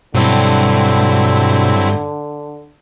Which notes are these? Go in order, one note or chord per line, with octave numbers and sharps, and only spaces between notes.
G2 B2 D3 F#3 C4 E4